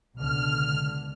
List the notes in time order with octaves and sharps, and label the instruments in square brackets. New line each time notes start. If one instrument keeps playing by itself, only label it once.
[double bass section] C#2 B2 D3 [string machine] F6